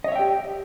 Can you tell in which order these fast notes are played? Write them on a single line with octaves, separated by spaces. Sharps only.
D#5 C#5 E5 G5 G4